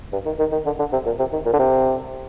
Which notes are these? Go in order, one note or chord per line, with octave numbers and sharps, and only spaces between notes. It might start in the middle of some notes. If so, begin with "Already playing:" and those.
G2
D#3
D#3
D#3
D3
D3
C3
A#2
C3
D#3
A#2
D3
C3